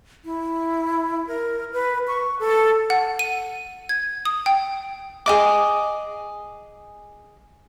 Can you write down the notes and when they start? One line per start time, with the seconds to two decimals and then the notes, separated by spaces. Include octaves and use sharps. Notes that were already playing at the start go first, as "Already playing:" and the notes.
0.25 E4
1.27 A#4
1.73 B4
2.08 C#6
2.39 A4
2.90 F#5
3.19 D#7
3.89 G#6
4.25 D#6
4.46 G5
5.26 G#4 D#5 D6